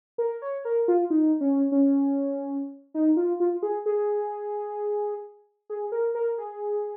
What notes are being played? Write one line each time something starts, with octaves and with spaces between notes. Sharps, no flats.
A#4
C#5
A#4
F4
D#4
C#4
C#4
D#4
F4
F4
G#4
G#4
G#4
A#4
A#4
G#4